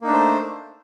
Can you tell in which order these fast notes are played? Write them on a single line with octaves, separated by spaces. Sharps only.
A#3 D#4 D4 A3 C5